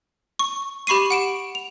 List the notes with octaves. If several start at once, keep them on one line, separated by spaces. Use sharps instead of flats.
C#6
G4 B5 C#6 C7 D#7
F#5 D7 E7
F7